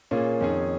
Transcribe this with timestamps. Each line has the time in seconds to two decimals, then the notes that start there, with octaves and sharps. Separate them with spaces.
0.11 A#2 A#3 C#4 F4 G#4
0.41 F2 D#3 C#4 G#4